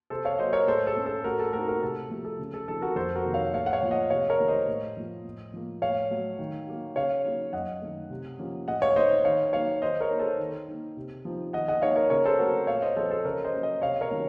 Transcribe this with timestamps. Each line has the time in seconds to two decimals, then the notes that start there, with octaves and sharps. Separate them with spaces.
0.10 C3 A4 C5
0.25 C#5 F5
0.38 F#3 A#3 C5 D#5
0.53 A#4 C#5
0.67 A2 A4 C5
0.87 A4
0.97 A3 C#4
1.06 A4
1.24 A2 F#4 A#4
1.40 A4
1.53 A3 C4 D#4 F#4 A#4
1.68 F#4 A#4
1.82 C3 A4
2.10 F3 A3
2.25 A4
2.39 C#3
2.54 A4
2.68 F3 C4 D#4 A4
2.82 F#4 A#4
2.96 F2 A4 C5
3.15 F#4 A#4
3.24 C3 D#3 A#3
3.34 C#5 F5
3.54 A2 C#5 F5
3.66 F#5
3.73 C#5 F5
3.82 F3 A#3
3.91 D#5 F#5
4.10 C3 C#5 F5
4.30 A#4 C#5
4.39 D#3 A3
4.48 C5 D#5
4.68 A2
4.97 F3 A3
5.25 A2
5.54 F3 A#3
5.82 A2 C#5 F5
6.11 F#3 A3
6.39 D#3
6.67 F#3 A#3
6.96 C#3 C#5 F5
7.24 F#3 A#3 D#4
7.53 F#2 D#5 F#5
7.82 D#3 A3
8.10 C3
8.39 F3 A#3 C#4
8.68 A2 D#5 F#5
8.82 C#5 F5
8.96 A3 D#4 C5 D#5
9.25 D#3 C#5 F5
9.53 F#3 A#3 D#4 C#5 F5
9.82 D#3 C5 D#5
10.00 A#4 C#5
10.10 A#3 D#4
10.20 A4 C5
10.39 D#3
10.68 A#3 D#4
10.97 C3
11.25 F3 C4 D#4
11.53 D#3 D#5 F#5
11.68 D#5 F#5
11.81 A#3 D#4 C#5 F5
11.96 A#4 C#5
12.10 C#3 A#4 C#5
12.26 A4 C5
12.39 F#3 A3 C4 F#4 A#4
12.67 A#2 C#5 F5
12.82 C5 D#5
12.97 F3 C4 A4 C5
13.11 A4 C5
13.25 C#3 A#4 C#5
13.44 C5 D#5
13.53 F#3 A#3 C#4
13.62 C5 D#5
13.82 C3 C#5 F5
14.01 A#4 C#5
14.11 D#3 F#3 A3 C#4